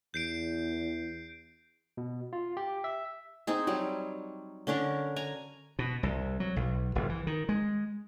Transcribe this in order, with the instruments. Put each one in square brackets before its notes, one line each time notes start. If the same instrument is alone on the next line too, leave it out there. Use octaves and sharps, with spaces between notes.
[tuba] E2 [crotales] G6 C7 D7
[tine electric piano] B2
F4
G4
E5
[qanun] C4 D#4 G#4
F#3 G3
D3 C#4 D4 A#4
G#5 A#5
[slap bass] B2
C2
F#3
B1
F#1
E3
D#3
G#3